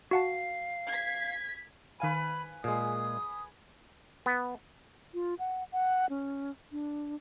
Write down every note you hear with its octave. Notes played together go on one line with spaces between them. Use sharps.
F#4 F5 F#5 A5
G#6 B6
D#3 B4 F5 G#5 B5 D#7
A#2 G#3 G#4 D#6
B3
F4
F#5
F#5
C#4
D4